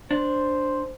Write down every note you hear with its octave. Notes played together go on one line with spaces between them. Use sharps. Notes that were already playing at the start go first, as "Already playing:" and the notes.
D4 C5